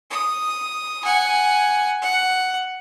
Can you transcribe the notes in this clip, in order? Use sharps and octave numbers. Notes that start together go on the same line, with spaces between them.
D#6
F#5 G#5
F#5